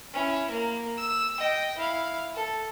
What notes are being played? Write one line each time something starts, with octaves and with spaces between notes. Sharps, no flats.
C#4 E4
A#3
E6
D#5 G5
E4 F5
A4